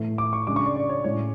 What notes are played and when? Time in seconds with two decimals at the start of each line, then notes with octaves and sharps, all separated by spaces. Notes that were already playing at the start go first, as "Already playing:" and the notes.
Already playing: A2 E3 A3
0.18 D6
0.33 C#6
0.47 C#3 G#3 D4 D6
0.56 C#6
0.66 D5
0.76 D5
0.89 C#5
1.04 A2 G#3 C#4 C#5